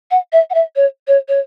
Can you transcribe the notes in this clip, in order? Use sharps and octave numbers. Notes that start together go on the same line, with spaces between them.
F#5
E5
F#5
E5
C#5
C#5
C#5